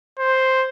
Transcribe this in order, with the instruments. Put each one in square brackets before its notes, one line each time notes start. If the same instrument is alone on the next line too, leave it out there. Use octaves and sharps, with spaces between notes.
[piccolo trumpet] C5